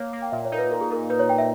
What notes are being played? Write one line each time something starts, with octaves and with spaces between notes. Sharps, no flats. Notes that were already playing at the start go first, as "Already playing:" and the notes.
Already playing: A#3 C#5
A#3
G5
A#2 E5
C#5
D#4 A#4
B4
A#2 A#4
G#4
A#2 A#4
D#4 B4
C#5
A#2 G5
E5